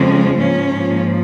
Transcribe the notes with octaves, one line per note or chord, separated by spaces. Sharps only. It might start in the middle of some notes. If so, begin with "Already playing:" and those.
Already playing: F2 C#3 F3 G#3 C4 C#4
G#2 F3 A#3 C#4